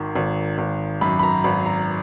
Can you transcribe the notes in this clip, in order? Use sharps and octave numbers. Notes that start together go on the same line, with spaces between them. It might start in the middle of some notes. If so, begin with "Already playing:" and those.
Already playing: G#1 D#3
G#1
G#1
F#2 B5
B5
A#5
G#1 B5
A#5